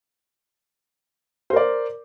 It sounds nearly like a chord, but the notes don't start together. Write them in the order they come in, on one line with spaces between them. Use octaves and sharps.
C5 A#4 D5